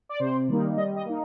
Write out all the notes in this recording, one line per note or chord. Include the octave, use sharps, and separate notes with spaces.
D5
C3 C5
D#3 G3 A#3 D#4
G3 D#5
D#5
A#3 D#4